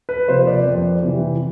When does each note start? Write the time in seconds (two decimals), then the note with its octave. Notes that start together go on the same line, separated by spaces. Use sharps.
0.09 B4
0.28 C3 F3 A#3 C5
0.47 D5
0.65 F2
1.03 C3 E3